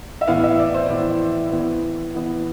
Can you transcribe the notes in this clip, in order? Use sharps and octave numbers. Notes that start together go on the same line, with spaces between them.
E5
A2 E3 B3 F5
E5
D5
C5
A2 E3 B3 D5
E3 B3
E3 B3